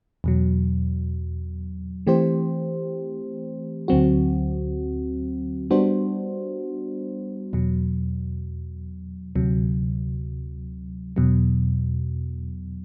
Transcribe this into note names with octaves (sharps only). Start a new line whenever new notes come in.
E2 B2 F#3
E3 A3 C4 G4 C5
D2 D3 F#3 C4 F#4
G3 B3 D4 F#4 C5
E2 B2 F#3
D2 C3 F#3
E2 B2 F#3